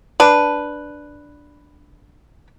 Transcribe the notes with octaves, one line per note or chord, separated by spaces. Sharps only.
D4 B4